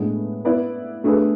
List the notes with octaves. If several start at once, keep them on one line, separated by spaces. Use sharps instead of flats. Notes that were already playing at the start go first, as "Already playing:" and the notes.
Already playing: A2 G#3 B3 D4
B3 E4 B4 D5
A3 D4 G#4 B4